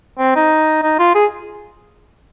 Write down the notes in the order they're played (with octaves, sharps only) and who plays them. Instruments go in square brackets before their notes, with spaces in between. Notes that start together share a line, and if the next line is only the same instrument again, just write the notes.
[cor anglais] C4
D#4
D#4
F4
G#4